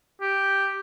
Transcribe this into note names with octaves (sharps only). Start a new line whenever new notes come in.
G4